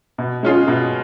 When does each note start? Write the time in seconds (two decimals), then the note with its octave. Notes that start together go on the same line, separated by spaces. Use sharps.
0.18 B2
0.43 G#3 C#4 F4 G#4
0.68 B2